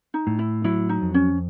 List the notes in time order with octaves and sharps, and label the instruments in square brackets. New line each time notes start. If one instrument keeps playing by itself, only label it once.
[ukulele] D#4
[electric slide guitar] A2
[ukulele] E4
[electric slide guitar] F#3 [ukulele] E4
[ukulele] D#4
[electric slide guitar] F2
[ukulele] C#4